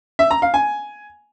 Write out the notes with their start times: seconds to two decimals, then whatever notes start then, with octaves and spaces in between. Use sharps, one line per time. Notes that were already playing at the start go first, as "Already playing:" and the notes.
0.19 E5
0.31 A#5
0.42 F5
0.54 G#5